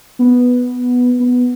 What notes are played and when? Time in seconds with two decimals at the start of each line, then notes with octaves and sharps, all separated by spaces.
0.19 B3
1.20 B3